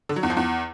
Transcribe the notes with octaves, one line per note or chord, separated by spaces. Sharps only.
D3
F#3
E2
F3
E2